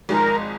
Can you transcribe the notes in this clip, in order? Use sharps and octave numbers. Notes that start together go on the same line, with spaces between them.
G#1 G#2 F3 G#3 D#4 A#4